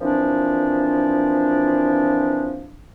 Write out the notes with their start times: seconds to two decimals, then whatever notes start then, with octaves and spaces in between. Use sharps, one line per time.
0.01 A#2 E3 F3 C4 D4